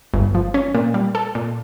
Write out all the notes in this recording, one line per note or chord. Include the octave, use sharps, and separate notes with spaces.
G1
F3
C#4
A#2
G3
A4
A#2